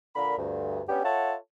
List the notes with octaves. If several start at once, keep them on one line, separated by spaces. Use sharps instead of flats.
A#2 D3 A#4 B5
D2 G2
G3 B3 C#4 D4 G4
F4 A4 C#5 E5 F#5 A5